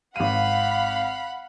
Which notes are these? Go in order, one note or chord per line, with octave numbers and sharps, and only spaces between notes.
G#1 F5 F#5 B5 D#7